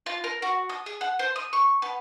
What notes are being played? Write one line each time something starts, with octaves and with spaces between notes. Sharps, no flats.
F4
A#4
F#4
D#6
G#4
F#5
C5
D#6
C#6
B3